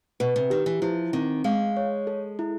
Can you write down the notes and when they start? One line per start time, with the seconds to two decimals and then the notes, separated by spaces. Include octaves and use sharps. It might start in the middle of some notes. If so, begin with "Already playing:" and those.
0.20 B2 B4
0.36 C3
0.50 D#3 G4
0.66 E3
0.82 F3 E4
1.13 D#3 C4
1.44 G#3 F5
1.77 C#5
2.07 A4
2.39 E4